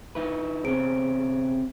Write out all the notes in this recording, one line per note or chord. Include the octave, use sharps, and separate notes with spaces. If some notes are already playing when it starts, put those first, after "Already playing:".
D#4 E4 B4
C3 C#4 G#4 C5 D7